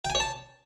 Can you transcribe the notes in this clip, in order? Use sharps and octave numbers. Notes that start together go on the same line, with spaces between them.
G5
G#5
C#5
A5